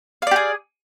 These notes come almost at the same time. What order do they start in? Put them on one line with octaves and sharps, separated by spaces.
F5 D5 G4 G#4